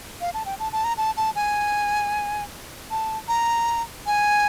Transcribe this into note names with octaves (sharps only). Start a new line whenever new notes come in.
F5
A5
G5
A5
A5
A#5
A5
A5
G#5
A5
A#5
G#5